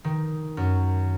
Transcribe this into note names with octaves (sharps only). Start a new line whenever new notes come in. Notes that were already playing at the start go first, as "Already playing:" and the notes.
D#3
F#2